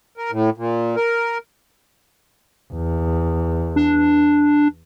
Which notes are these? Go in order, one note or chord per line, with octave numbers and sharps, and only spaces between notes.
A#4
A2
A#2
A#4
E2
D4